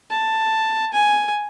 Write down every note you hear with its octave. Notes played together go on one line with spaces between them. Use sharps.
A5
G#5